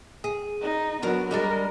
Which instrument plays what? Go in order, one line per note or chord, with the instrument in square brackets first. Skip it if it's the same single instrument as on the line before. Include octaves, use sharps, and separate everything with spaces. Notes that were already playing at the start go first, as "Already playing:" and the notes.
[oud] G#4
[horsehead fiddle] D#4
[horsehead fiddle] F#3 B3 [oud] D4 A#4
[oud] G3 G#3 D4 [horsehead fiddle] A#4